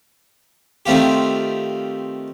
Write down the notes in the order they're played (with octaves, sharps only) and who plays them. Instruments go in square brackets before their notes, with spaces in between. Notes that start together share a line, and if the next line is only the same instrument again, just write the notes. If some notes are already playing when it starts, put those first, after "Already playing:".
[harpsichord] D#3 A3 C4 F4 G4